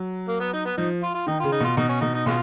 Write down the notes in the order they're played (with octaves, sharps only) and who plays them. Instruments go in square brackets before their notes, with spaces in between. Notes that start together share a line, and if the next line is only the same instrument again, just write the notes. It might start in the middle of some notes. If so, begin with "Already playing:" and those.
Already playing: [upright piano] F#3
[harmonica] A#3
B3
D#4
B3
[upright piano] F3 [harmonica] D#4
[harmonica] F4
F4
[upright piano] D#3 [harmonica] D#4
[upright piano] C#3 [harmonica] F4
[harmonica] D#4
[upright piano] B2 [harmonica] F4
[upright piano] B2 [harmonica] D#4
[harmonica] C#4
[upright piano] B2 [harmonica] D#4
[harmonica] D#4
[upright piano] B2 [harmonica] G#3 C#4 F4